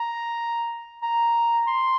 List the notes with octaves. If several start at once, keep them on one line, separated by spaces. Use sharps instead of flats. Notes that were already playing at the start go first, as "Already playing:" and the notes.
Already playing: A#5
A#5
C6